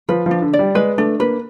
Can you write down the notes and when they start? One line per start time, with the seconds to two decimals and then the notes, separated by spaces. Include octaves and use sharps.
0.09 F3 B4
0.26 F3 D4
0.42 D3
0.53 D5
0.59 G3
0.75 G#3 B4
0.98 A3 D4
1.20 A#3 B4